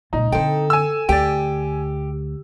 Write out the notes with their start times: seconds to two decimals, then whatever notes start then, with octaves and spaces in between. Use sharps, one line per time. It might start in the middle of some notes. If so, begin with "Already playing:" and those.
0.13 C#2 A#2 D#4
0.32 D3 C4 A4 C5 G5
0.70 G#5 E6
1.09 D2 G4 D5 G5